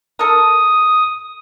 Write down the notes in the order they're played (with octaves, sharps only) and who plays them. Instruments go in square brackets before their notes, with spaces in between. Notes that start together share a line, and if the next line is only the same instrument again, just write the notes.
[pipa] A4 A#4 [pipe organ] D#6